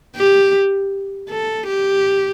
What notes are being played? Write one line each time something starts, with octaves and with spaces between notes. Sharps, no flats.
G4
A4
G4